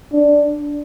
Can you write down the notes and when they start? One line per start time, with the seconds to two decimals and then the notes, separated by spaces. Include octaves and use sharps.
0.13 D4